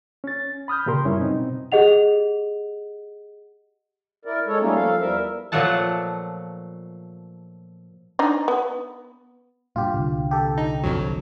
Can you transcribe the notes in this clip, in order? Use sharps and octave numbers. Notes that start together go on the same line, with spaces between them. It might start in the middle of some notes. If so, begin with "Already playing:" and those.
C#4 A6
B5 D#6 F6 G6
A#2 C#3 G4 A#4 C6
F#2 G3 C#4 E4
B2 C4 D#4
G4 G#4 D#5 F#5 F7
E4 A#4 D5
G#3 A4 C#5
G3 A3 A#3 C#4 D#4 F4
F3 A4 F5
E2 G3 A#4 E5
A#2 F3 F#3 A3 F#5 A5
D4 D#4
B3
G2 A#2 F4 G4
C2 A#2 D3
G4 A4
D#4
G#1 F2 F#3